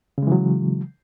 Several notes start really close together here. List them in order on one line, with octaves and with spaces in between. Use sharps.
C#3 G#3 E3 F#3